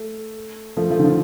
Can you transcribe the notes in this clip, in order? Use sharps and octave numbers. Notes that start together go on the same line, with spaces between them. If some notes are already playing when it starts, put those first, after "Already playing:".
Already playing: A3
F3 A3
F3 A3
D#3
D3 F3